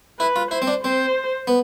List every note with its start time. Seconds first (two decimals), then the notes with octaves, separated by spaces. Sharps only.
0.20 E4 B4
0.36 F4
0.51 E4 C5
0.62 C4
0.67 D4
0.83 C4 C5
1.47 B3